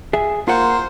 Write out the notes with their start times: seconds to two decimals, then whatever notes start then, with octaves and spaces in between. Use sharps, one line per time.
0.13 G#4 E5
0.48 A#3 F4 C5 F#5